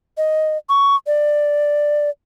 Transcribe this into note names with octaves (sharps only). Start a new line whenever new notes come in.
D#5
C#6
D5